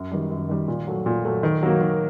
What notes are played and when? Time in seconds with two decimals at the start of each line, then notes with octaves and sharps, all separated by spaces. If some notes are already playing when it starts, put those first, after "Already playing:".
Already playing: F#2
0.12 D#3 G3
0.31 F#2
0.49 D#3 G3
0.68 A#2
0.87 F#3 A3
1.06 A#2
1.25 F#3 A3
1.43 D#3
1.63 F#3 A#3
1.81 D#3